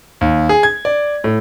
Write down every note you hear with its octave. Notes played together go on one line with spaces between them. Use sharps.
D#2
G#4
G#6
D5
A2